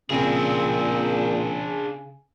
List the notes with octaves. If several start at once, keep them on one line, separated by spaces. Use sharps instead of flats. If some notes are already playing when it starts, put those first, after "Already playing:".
A#2 C#3 C4 D4 G#4